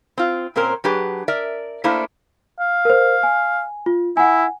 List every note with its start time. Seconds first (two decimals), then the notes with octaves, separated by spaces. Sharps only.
0.18 C4 F4
0.56 A#2 C4 C#4 A#4 C5
0.84 F#3 D4 G4 G#4 B4
1.28 A#4 D5 E5
1.84 A3 A#3 D4 E4 A#4 C5
2.60 F5
2.85 A#4 C5
3.23 G#5
3.86 F4
4.17 E4 F#5 G#5